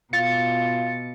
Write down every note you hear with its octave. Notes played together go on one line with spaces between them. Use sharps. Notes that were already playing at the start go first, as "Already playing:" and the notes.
B2 F4 A6 C#7